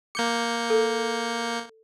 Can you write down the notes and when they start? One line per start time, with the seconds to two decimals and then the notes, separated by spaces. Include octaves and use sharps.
0.15 A#3 D6 G6 C#7
0.70 A4